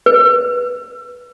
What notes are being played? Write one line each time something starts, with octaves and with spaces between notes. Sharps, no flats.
B4